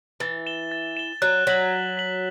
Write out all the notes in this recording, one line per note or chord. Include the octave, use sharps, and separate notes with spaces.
E3 A6
E7 G7
A6
E7 G7
F#3 F#6
F#3 B6 F#7
F#6
B6 F#7